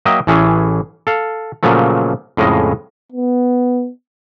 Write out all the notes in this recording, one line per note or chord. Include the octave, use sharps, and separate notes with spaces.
F#3 A#3 D#5 E5 G5
A1 E3 A3 C#4 G#4
A4 F5
A#2 C#3 F3 F#3 A3
F2 A2 C#3 G#3 D#5
B3